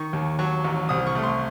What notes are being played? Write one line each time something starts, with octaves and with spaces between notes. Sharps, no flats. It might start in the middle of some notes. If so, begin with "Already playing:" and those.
Already playing: D#3 C#6
D#2
F#3 C#6
A1
C2 D#6
C#6
A3
C6